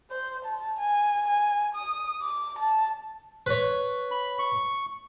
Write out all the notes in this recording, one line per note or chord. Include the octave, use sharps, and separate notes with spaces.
C5
A5
G#5
G#5
D#6
D6
A5
B4 C#5
B5
C#6